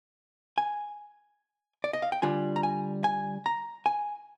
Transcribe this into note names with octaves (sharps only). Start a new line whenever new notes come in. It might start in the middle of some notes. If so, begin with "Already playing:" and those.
G#5
D5
D#5
F5
G5
D3 G3 D4 F4 G#5
A#5
G#5
G#5
A#5
G#5